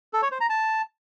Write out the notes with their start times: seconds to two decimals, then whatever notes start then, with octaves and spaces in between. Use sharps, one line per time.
0.13 A4
0.22 C#5
0.31 C5
0.41 A#5
0.50 A5